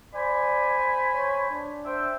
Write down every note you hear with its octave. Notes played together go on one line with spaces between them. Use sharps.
C5 D5 G#5 B5
C#5
D4
C5 E5 G5